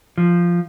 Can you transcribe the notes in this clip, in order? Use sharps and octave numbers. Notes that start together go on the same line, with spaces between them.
F3